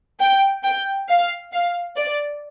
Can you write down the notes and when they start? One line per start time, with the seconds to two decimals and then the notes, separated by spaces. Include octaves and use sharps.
0.21 G5
0.64 G5
1.09 F5
1.53 F5
1.97 D5